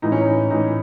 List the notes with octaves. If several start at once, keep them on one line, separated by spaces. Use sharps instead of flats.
A2 E3 D#4
C#4
D#4
A2 E3 D#4